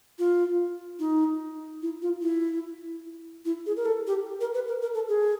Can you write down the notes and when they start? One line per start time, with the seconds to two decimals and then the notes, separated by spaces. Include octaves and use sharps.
0.19 F4
0.99 D#4
1.82 E4
2.02 F4
2.22 E4
3.45 E4
3.66 G#4
3.77 A#4
3.85 A4
4.07 G4
4.41 A#4
4.54 B4
4.68 A#4
4.82 A#4
4.94 A4
5.08 G#4